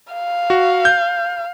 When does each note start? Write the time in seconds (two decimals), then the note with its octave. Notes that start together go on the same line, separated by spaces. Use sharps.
0.13 F5
0.50 F#4
0.85 G6